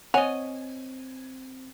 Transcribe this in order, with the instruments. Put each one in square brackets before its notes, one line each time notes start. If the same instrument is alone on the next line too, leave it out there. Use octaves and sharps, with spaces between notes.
[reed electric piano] C4 [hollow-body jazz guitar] C#5 D#5 [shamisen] F#5 [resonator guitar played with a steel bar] G#5